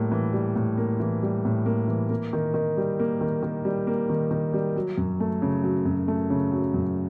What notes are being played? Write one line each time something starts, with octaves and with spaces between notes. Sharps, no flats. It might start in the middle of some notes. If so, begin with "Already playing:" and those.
Already playing: A2 G3 A#3
E3
G3
A2
A#3
E3
G3
A2
A#3
E3
A#3
D#3
D#3
G3
A#3
D#3
D#3
G3
A#3
D#3
D#3
G3
F#3
F#2
A3
C#3
F#3
F#2
A3
C#3
F#3
F#2